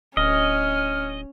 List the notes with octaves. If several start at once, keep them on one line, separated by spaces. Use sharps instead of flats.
D1 C#4 D#5 F6